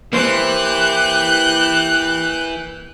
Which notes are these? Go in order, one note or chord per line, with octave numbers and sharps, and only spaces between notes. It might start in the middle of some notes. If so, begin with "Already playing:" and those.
E3 A#3 E4 G4 C5 F#6 G6